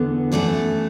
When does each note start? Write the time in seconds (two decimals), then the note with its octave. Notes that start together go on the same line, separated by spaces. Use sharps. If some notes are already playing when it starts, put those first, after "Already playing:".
Already playing: E2 D3 B3
0.32 F#2 E3 A3 A4 D5